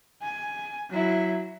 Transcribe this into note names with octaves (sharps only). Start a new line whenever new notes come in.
G#5
F#3 E4